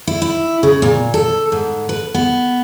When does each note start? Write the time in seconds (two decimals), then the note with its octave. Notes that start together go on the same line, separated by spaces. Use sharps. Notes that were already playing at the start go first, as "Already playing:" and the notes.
0.07 E4
0.22 E4
0.63 C#3
0.82 A#2
1.14 A4
1.52 G#2
1.89 B4
2.14 B3